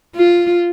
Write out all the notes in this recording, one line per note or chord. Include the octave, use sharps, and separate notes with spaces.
F4